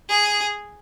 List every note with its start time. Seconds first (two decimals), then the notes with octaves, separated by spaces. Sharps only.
0.09 G#4